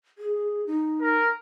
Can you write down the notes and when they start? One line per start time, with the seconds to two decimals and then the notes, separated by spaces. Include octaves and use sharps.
0.18 G#4
0.67 D#4
1.01 A#4